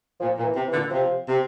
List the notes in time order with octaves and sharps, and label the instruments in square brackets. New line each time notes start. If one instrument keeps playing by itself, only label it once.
[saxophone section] A#2 [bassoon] F3
[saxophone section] A#2
[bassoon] E3
[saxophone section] C3
[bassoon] E3
[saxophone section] A#2 D3
[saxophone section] C3 [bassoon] F3
[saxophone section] C3